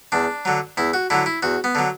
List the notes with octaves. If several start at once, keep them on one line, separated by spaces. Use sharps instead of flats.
E2 D4
D3 F#3
E2 E4
F#4
D3 F#3 E4
E4
E2 F#4
B3
D3 F#3